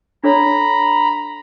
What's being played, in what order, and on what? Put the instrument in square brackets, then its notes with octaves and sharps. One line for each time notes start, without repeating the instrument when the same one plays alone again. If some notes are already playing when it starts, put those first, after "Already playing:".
[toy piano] D4 A4 C#5 [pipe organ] A#5 B5